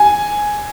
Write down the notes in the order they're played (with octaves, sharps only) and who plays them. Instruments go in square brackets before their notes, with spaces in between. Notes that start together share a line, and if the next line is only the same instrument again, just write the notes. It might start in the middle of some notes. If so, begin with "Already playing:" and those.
Already playing: [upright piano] G#5